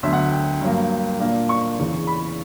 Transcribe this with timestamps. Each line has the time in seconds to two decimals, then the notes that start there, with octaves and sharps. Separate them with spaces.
0.03 D2 D3 F#3 B3 E5
0.13 F#5
0.31 G5
0.61 G2 F#3 A#3
1.20 A#2 A#3 D4
1.49 C#6
1.78 E2 C#3 E3
2.07 B5